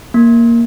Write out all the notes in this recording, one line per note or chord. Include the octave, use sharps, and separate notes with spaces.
A#3